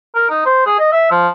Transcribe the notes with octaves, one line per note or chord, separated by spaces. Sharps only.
A#4
D#4
C5
G#4
D#5
E5
F3